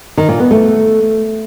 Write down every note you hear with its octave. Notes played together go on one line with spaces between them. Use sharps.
D#3
A#2
B3
A3